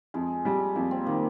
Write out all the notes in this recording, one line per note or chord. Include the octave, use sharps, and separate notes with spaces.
F2 G#3
G3
F2 A#3
C4
D#3 A#3